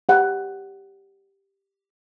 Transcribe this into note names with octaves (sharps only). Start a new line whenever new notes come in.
G4 F#5